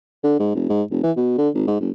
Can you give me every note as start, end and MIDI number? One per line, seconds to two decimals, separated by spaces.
0.24 0.35 50
0.39 0.53 44
0.55 0.67 29
0.69 0.82 44
0.91 0.99 29
1.03 1.11 52
1.17 1.37 47
1.38 1.49 50
1.55 1.62 32
1.67 1.76 44
1.80 1.90 30